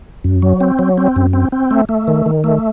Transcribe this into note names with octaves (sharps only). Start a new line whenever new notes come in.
F#2
F#3
C4
F#3
C4
F#2
C4
C4
A3
A3
D#3
D#3
A3